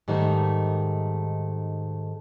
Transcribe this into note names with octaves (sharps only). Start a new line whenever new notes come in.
G#2 D#3 G3 A3 D#4